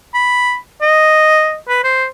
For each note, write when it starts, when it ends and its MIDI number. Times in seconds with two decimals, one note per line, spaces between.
0.14 0.56 83
0.82 1.56 75
1.69 1.82 71
1.84 2.06 72